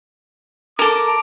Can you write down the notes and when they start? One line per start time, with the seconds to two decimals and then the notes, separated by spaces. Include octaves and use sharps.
0.79 A4 A#4 D6